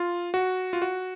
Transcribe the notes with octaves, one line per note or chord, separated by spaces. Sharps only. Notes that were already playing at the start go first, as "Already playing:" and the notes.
Already playing: F4
F#4
F4
F#4